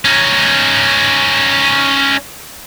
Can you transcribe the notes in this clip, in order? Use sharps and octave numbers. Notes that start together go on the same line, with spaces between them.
C#4 D#4